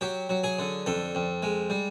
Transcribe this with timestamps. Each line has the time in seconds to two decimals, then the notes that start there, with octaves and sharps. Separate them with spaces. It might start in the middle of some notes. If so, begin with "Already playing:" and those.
0.01 F#3 G4
0.29 F#3
0.44 G#4
0.59 D3
0.86 F2 A4
1.15 F2
1.43 G#3
1.70 G3